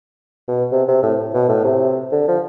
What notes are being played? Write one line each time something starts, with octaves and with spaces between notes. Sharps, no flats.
B2
C3
C3
A2
B2
A2
C3
D3
F3